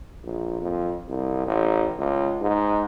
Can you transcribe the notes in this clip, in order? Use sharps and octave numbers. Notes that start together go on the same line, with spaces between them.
A#1
F2
C2
A1
C#2
G#2